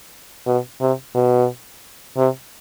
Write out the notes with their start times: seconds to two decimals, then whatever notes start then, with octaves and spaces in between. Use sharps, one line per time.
0.47 B2
0.81 C3
1.15 B2
2.17 C3